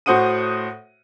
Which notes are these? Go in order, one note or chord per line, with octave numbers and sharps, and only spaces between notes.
A2 F#4 C5 F#5 D#6 D#7